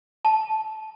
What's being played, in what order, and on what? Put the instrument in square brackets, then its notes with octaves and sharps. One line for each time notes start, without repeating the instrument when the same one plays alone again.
[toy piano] A5